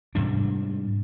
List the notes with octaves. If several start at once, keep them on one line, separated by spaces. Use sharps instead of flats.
G#2 C3 G3 D4